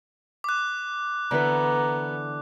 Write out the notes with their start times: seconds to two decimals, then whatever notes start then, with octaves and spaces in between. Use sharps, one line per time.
0.44 D6 F#6
1.31 D3 E3 B3 B4 A#5